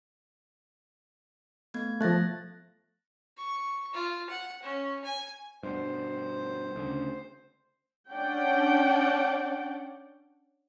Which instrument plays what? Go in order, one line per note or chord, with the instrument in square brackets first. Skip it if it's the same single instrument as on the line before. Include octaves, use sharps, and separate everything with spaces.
[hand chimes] A3 B3 G#6
[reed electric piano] F3 A3 [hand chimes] F#6 A6 A#6
[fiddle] C#6
F4
F#5
C#4
G#5
[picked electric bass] G2 B2 [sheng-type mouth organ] C5
[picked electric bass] D2 C#3
[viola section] C#4 D4 D5 F#5 G5